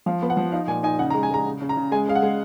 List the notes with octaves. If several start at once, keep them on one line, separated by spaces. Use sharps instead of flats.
F3 F5
B3
F#5
F3
D#4 F5
A#2 G#5
D#4 G#5
C#3 F#5
A#5
G#3
G#5
G#3 A#5
C#3
C#3
A#5
C#3
G#3 G#5
G#3 F5
F#5
G#3